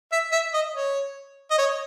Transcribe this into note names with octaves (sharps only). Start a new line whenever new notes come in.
E5
E5
D#5
C#5
D#5
C#5